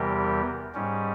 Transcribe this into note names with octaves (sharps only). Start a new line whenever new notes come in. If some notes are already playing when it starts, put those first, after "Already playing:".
Already playing: E2 C3 E3 G3 G4 A#4
G#2 G3 C#4